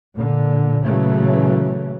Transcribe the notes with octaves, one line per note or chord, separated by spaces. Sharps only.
A#2 D3
A#2 C#3 E3 F#3 A3